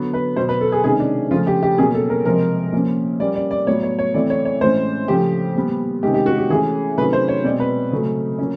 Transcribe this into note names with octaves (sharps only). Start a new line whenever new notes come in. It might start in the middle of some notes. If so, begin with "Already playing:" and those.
Already playing: D3 F#3 B3
B4
B2 F#3 B3 C5
B4
A4
G#4
C3 D#3 G#3 C#4 G#4
D4
C#3 F3 A3 C#4 F4
G4
G4
B2 F#3 A#3 C#4 G#4
A4
A#4
C3 F3 G#3 A#4
A#2 F3 A#3 C#4
A#2 G3 A#3 C#4 D5
D5
D5
A2 F#3 B3 C#5
C#5
C#5
E3 A3 C4 D5
C#5
C#5
A2 E3 G#3 C#4 C5
C#3 F3 A3 G4
A#2 G3 B3
C3 D#3 G#3 C#4 G4
G4
F#4
G4
E3 A3 C#4 G#4
C3 D#3 F#3 A3 C#4 B4
C5
C#5
B2 G#3 C4 D5
B4
C#3 F#3 A3 C#4
F#3 A#3 C#4